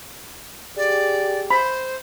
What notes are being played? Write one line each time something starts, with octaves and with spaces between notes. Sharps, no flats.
G4 G#4 D5
C5 B5